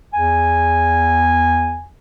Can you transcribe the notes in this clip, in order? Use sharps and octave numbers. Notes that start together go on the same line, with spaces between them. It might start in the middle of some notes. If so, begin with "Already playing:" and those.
E2 G#5